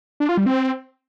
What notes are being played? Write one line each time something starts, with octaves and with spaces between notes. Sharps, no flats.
D4
F4
G3
C4